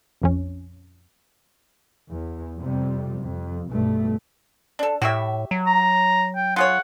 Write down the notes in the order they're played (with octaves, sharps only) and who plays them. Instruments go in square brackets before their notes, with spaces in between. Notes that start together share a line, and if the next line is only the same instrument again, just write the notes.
[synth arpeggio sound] A#1 F2 C#4
[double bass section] E2
F2 C3 G3
F2
B1 G2 A3
[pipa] D4 A4
[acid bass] A2 [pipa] F#4 G4 E5
[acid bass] F#3
[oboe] A#5
G5
[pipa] F4 G#4 C#5 [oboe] F#5